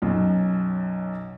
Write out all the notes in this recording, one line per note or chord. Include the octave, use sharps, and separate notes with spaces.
B1 F#2